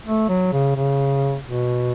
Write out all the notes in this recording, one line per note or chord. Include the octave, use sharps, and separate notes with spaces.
A3
F#3
C#3
C#3
B2